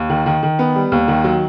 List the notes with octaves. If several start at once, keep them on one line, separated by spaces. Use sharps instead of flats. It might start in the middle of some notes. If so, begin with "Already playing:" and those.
Already playing: D#2
D#3
D#3
D#3
B3
G3
D#2
D#3
F#3